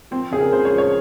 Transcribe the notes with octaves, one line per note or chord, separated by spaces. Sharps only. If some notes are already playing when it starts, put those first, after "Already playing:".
F3 C4
C#3 G#4
A#4
C#2 C5
C#5
F3
C#5